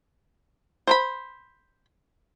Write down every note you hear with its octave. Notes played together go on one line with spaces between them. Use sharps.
C5 A#5 B5